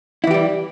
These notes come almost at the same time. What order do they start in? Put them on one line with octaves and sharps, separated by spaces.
E4 E3 G4 G3